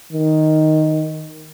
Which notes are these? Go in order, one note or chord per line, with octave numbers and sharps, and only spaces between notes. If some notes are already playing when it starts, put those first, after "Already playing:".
D#3